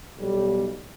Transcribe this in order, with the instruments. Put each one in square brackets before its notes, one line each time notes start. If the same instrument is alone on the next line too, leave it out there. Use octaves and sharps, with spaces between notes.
[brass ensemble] B1 B2 G3